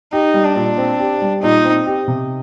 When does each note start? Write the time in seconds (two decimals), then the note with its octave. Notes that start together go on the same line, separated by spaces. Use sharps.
0.13 D#4 G4
0.34 G3
0.45 D4
0.56 A#2
0.78 C4
1.00 G4
1.22 G3
1.43 A#2 D#4
1.65 C4
1.87 G4
2.08 C3